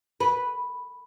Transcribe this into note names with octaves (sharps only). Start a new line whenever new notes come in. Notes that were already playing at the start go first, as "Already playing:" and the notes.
B4